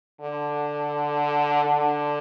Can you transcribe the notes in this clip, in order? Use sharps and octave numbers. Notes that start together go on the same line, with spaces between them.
D3
D3